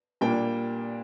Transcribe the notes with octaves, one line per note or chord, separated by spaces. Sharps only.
A#2 G3 A#3 D4 G5